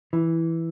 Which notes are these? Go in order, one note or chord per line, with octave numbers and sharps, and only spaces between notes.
E3